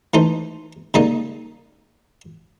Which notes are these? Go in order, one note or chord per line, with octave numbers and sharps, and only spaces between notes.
E3 A3 D#4 C5
C#3 G3 A#3 D#4 D#5